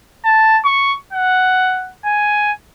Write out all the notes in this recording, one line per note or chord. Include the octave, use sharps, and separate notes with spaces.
A5
C#6
F#5
G#5